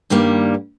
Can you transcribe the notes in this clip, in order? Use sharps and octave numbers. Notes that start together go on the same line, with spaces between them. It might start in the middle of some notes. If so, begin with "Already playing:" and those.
G2 D#3 G3 A#3